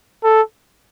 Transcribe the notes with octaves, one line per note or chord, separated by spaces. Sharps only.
A4